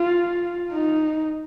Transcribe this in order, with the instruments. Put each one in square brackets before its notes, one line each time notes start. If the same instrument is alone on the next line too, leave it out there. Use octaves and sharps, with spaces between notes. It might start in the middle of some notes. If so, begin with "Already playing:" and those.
Already playing: [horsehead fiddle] F4
D#4